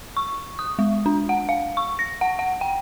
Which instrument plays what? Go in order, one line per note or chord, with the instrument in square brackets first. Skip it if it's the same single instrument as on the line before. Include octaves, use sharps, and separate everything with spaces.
[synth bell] C#6
D#6
G#3
D4
F#5
F5
C#6
A#6
F#5
F#5
G5